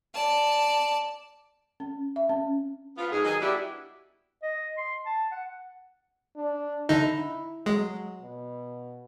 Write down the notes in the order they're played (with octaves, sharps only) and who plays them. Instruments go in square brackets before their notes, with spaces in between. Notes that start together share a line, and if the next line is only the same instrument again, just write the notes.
[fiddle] D5 A5
[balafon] C#4
E5
C#4
[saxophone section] F3 B3 F4
G#2 G#4
D#3 F#3 D#4 G#4
G3 B3 D4 E4 F#4 G4
[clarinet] D#5
C6
A5
F#5
[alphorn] D4
[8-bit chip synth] D3 D#4 [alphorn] E4
[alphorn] F#3 [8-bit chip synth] G#3
[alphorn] B2